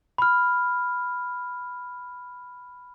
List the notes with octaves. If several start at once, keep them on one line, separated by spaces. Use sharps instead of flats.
B5 F6